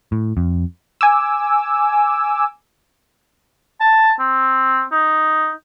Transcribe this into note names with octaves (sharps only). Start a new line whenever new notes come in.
A2
F2
G#5 D6 E6
A5
C4
D#4